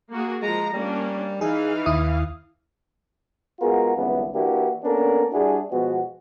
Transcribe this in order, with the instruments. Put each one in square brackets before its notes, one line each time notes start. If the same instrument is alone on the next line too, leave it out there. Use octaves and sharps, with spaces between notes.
[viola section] A#3 F#4 G#4
[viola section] F3 A#5 [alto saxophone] G#3
[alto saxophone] G3 [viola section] A#3 C#4 D4
[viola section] E3 F5 [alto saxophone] D#4 [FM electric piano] G#4
[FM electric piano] D#2 E4 D#6
[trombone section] G#3 B3 F4 F#4 G#4 A#4
G#1 C#2 F#2 E3 G3 B3
E3 A#3 D4 E4 F#4 G4
A#3 B3 C#4 D4 A4 A#4
G3 D4 E4 F#4 G#4
B2 F3 G#3 B3 F#4